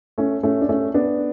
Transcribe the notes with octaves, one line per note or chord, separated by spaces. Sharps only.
A3 C#4
A3 C#4
D4
A3 C#4
B3 D4